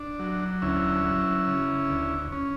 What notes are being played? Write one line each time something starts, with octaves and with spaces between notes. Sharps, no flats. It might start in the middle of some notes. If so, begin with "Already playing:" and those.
Already playing: D4
F#3
D2 C#4 E4
F#3
C#3
D2
C#4